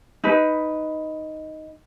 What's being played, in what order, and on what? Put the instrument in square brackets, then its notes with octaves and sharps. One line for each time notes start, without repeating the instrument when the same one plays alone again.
[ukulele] D#4 B4